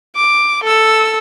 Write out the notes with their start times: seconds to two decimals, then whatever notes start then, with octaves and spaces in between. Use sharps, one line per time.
0.16 D6
0.64 A4 E6